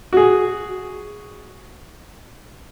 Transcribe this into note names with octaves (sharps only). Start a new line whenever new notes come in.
F#4 G#4